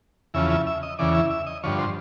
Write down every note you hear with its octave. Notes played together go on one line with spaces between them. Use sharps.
E2 C#3 F3 E5
E5
E5
D#5
E2 C#3 E3 D5
E5
E5
D#5
G2 D3 F3 C#5
C5